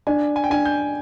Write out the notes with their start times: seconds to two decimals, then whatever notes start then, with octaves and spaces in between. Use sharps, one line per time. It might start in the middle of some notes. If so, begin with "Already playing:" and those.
0.07 D4 G#5
0.36 G#5
0.44 G5
0.50 D4 G#5
0.65 G6